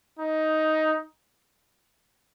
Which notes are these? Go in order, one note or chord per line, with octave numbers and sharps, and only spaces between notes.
D#4